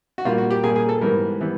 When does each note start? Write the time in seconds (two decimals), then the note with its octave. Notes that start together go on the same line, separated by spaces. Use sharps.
0.18 F#4
0.25 A#2 G3 A#3 F4
0.38 F#4
0.51 G4
0.63 A#2 G3 A#3 G#4
0.76 G#4
0.89 A4
1.01 G#2 E3 G3 B3 A#4
1.41 E3 G3 B3